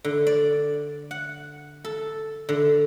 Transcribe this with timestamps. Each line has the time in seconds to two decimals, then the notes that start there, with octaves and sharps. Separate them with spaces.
0.04 D3
0.27 D5
1.11 F#5
1.85 A4
2.49 D3